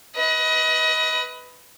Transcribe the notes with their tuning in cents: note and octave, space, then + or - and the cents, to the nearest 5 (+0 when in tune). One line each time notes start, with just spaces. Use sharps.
B4 +0 D#5 +25